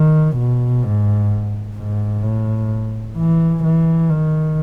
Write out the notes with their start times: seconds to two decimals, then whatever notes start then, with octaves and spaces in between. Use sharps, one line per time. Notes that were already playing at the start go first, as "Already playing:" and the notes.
Already playing: D#3
0.36 B2
0.84 G#2
1.77 G#2
2.23 A2
3.17 E3
3.64 E3
4.09 D#3